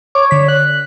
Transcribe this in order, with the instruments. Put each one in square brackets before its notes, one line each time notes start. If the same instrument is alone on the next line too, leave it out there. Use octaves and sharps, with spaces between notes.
[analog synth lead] C#5 [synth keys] D6
[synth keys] D3 B6
[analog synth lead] F#6